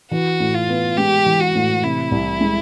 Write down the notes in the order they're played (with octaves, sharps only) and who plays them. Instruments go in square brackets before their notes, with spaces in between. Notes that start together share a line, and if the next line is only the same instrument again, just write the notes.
[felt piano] E3 [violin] F#4
[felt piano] A2
[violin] F4
[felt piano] B3
[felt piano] G#3 [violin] G4
[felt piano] E3
[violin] F#4
[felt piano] A2
[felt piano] C3 [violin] E4
[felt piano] C2
G#3